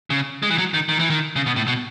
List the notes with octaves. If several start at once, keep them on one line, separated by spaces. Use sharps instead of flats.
C#3
G#3
E3
F#3
D#3
D#3
E3
D#3
C#3
B2
A2
B2